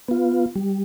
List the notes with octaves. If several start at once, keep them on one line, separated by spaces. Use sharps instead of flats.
B3 F4
G3